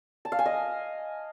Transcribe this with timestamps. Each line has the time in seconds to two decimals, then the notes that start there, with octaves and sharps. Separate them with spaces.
0.25 A5
0.32 F5
0.39 G#5
0.46 D#5